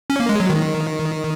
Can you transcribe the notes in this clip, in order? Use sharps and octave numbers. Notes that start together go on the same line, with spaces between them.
C#4
A#3
G#3
F#3
D#3